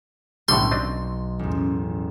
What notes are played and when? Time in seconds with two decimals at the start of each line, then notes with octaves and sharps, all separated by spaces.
0.48 B1 A2 D3 G3 C6 C#6
0.71 C4 D4 D#5
1.39 A1 E2